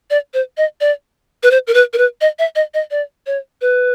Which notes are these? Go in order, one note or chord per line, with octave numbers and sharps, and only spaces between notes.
D5
C5
D#5
D5
B4
C5
A#4
B4
A#4
B4
D#5
E5
D#5
D#5
D5
C#5
B4